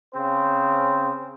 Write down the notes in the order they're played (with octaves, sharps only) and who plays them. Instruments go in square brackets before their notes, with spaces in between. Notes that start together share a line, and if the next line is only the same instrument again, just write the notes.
[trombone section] C#3 C4 C5